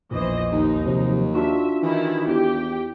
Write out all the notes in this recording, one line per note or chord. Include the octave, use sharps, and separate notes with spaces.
A#1 E2 A#2 E3 C5 D#5
D#2 D#4
C3 F3 F#3
D4 F4 F#4 E5
D#3 E3 E4
E2 G4 G5